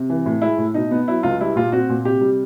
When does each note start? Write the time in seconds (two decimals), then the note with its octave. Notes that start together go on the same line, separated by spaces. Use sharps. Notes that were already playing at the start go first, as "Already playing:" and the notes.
Already playing: C3
0.09 E3
0.26 A2
0.42 G#3 E4
0.58 A2
0.74 B2 D#4
0.91 B3
1.08 F#3 E4
1.23 C#2 F4
1.41 G3 E4
1.56 A#2 F4
1.72 C4 F#4
1.89 A#2
2.05 C3 G4
2.21 G3